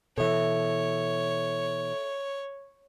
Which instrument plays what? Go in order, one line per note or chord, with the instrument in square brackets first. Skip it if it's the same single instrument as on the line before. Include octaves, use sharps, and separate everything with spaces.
[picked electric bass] B2 E3 [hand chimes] A4 E5 [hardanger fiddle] C#5